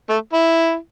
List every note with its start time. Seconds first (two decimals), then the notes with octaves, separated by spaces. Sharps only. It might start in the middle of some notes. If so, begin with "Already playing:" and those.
0.09 A3
0.33 E4